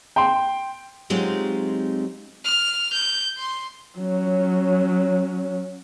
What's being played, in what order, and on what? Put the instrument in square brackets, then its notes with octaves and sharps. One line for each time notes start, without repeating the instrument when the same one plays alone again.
[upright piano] G5 C6
[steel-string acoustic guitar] F#3 G#3 C4 D#4 F4 G4
[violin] F6
G6
C6
[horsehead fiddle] F#3 C#4